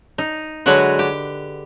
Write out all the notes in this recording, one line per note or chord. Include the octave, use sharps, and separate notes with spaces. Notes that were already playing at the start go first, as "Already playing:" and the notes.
D#4
D3 F#3 G#3 F#4 B4
G4